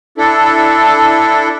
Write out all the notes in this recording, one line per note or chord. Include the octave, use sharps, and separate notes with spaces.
D4 E4 A4